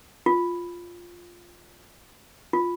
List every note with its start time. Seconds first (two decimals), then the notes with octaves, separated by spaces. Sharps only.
0.26 F4
2.53 F4